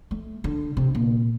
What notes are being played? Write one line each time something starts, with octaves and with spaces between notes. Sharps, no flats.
A3
D3
C3
A#2